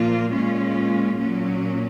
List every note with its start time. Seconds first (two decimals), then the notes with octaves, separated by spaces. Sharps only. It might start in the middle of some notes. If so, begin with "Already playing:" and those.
Already playing: A#2 F3 A#3 F4
0.33 A#2 G#3 C#4 F4
1.18 A#2 F#3 C#4